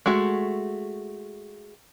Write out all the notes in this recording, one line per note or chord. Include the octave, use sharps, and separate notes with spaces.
G#3 A3 F#4